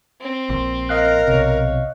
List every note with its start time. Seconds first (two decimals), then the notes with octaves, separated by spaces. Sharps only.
0.21 C4
0.50 A#1 C6
0.89 A#4 D#5 F5 F#6
1.28 B1 C3 C#5